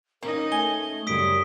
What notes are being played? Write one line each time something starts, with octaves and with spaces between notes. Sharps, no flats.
A#3 C#4 D#4 A#4 D#5
A3 G#5 G7
F#2 C#3 G3 D#6 B6 D7